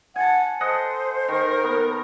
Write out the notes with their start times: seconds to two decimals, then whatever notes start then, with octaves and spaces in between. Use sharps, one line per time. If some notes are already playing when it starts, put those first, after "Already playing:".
0.16 F#5 G#5 A5
0.60 A4 C5 D#5 F#5
1.28 D#3 A#4
1.64 B3